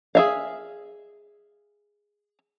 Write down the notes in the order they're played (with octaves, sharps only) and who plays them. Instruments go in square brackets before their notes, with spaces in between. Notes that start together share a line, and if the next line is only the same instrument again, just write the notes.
[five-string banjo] G#4 E5 F5